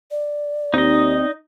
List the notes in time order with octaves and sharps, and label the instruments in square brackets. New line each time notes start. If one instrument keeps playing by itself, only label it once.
[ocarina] D5
[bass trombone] D#2 [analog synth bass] C4 [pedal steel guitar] D#4 D#5